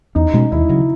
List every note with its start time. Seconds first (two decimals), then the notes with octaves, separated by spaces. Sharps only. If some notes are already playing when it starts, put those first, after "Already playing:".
0.15 E2 D#4
0.34 B2 G#3 C#4
0.52 D#2 E4
0.69 C#3 F#3